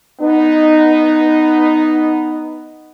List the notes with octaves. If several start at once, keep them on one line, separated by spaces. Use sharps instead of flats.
B3 D#4